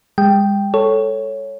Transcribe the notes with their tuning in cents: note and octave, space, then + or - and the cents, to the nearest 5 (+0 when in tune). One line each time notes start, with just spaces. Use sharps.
G#3 -40 G5 +0
A4 +0 C#5 +0